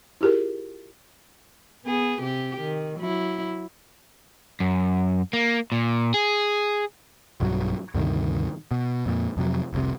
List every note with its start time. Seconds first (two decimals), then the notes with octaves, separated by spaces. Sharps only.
0.21 E4 F4 G4 G#4 A#4
1.86 B3 G#4
2.22 C3 G4
2.61 D#3
3.00 F#3 E4
4.60 F#2
5.33 A#3
5.72 A#2
6.14 G#4
7.40 B1 G2 E3 F#3
7.95 D2 G2 C3 D#3
8.71 B2
9.06 F2 A#2
9.37 F2 C3 F#3
9.73 F1 C2 C3